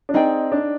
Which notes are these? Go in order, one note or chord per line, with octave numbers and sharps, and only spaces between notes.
D4
C4 D#4 G#4 D5 G5
D4